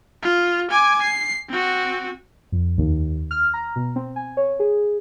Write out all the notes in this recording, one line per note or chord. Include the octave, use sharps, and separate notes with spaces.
F4
G#5 D6
C7
C4 F#4
F2
D#2
F6
A#5
B2
C4
G#5
C#5
G#4